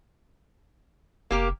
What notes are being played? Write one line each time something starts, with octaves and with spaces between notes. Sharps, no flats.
F1 A#3 G4 A#4